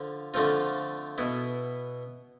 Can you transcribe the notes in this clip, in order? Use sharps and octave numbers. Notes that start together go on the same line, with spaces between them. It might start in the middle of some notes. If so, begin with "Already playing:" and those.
Already playing: D3 F3
D3 F3 A3 C4 F4
B2 B3 E4